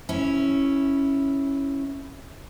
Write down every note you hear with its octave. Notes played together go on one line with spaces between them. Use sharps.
C#4 E4